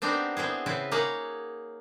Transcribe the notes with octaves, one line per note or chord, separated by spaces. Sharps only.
B3 C4 D4 D#4 G4 A#4
B3 C4 E4 G#4
C#3 C4 E4 B4
A#3 D#4 G#4 C#5 F#5